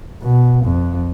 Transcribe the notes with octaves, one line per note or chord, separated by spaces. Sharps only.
B2
F2